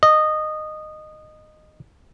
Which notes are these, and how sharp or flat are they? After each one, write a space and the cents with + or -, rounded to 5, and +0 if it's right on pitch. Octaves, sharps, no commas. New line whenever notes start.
D#5 -15